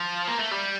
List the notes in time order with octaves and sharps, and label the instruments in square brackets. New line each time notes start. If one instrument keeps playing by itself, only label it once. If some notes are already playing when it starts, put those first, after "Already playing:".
Already playing: [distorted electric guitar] F3
A#3
A3
G3